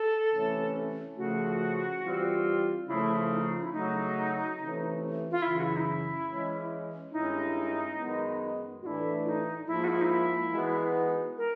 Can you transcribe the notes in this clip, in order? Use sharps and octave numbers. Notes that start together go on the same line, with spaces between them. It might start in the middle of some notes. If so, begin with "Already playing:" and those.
Already playing: A4
C3 E3 A3 C#4
C#3 F3 A3 F#4
E3 G3 C4 F4
C#3 F3 A3 E4
F4
D#4
E4
C#3 F#3 A3 D#4
C3 E3 A3 C#4
F4
F#2 C#3 E3 E4
F#4
E4
D#4
E4
E3 G#3 C#4
G2 D#3 G#3 C#4 D#4 E4
F#2 D#3 G#3 B3
A2 E3 A3 D4 E4 F#4
F4
D#4
G#2 F3 A#3 E4
F#4
E4
D#4
E4
E3 G#3 B3 D#4 F#4
A#4